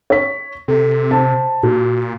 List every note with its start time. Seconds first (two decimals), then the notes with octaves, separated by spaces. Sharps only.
0.10 C#5 B6
0.68 C3 A4
1.11 C5 A5
1.63 A#2 F#4